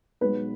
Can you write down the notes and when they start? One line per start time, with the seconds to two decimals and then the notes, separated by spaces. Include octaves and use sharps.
0.21 B1 B2 G#3 B3 B4